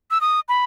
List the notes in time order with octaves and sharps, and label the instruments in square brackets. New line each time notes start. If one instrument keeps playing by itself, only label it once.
[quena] E6
D#6
B5